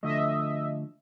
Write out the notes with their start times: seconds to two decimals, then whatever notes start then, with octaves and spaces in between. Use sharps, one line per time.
0.03 D3 F3 A3 D#5 E5